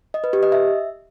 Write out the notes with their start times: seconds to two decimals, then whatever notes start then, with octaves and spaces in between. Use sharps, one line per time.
0.14 D#5
0.24 B4
0.33 G4
0.43 D#5
0.52 E5